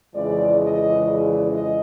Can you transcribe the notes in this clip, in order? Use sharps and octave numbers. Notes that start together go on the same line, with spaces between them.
F2 C#3 E3 G#3 D5
D#5
D5
D#5